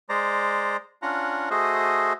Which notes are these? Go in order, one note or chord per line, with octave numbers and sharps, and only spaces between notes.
G#3 C5 D5 A#5
C#4 D4 F4 F#5 A#5
A3 F#4 G#4 C5 D#5